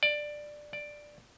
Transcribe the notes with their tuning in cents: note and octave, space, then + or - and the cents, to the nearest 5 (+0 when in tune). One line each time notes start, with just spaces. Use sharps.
D5 +10
D5 +5